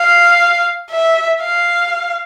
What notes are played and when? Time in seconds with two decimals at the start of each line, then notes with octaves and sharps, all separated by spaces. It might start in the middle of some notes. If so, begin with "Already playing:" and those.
Already playing: F5
0.91 E5
1.41 F5